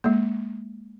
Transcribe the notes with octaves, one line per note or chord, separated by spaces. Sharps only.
G#3 A#3